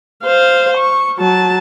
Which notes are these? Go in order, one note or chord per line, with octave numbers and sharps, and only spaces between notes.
C5 F5
C#6
F#3 A5